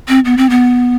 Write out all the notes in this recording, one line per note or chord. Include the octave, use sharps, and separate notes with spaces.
C4
B3
C4
B3